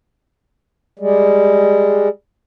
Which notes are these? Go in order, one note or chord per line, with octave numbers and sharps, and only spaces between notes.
G3 G#3